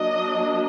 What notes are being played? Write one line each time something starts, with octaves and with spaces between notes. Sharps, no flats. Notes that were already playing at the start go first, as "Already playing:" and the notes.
Already playing: F#3 A#3 D4 D#5